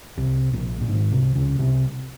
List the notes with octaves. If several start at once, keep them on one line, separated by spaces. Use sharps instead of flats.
C2 C3
A#1 A#2
A#2
G#1 G#2
C2 C3
C#2 C#3
C2 C3